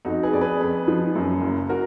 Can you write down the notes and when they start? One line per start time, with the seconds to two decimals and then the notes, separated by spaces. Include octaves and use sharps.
0.05 F2 D#4 F#4
0.23 G#4 B4
0.33 F2 D5
0.41 G#4 B4
0.61 F2
0.88 F3
1.15 F#2
1.42 F#1
1.69 F#4 A#4